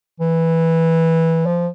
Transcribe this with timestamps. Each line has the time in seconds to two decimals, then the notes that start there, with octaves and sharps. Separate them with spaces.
0.20 E3
1.46 F3